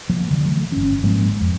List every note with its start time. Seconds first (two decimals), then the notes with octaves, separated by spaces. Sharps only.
0.09 F3 F#3 A#3
0.31 D3 F3
0.45 E3 F#3 A3
0.72 G1 C#4
1.03 G#2 F3 G#3 A#3
1.41 F2